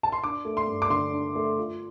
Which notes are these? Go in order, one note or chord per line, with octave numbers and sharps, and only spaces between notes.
A5
C6
D4 D6
A3
C6
G2
D6
D3 C6
D4
A3
F4